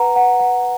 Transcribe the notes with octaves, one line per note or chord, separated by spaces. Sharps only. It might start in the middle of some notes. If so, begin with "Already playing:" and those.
Already playing: B4 F#5 A#5
F#5
F#5